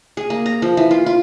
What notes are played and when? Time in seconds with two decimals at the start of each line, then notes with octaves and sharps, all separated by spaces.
0.17 G#4
0.30 A#3
0.46 A#5
0.62 F3
0.77 E3
0.91 F4
1.06 F4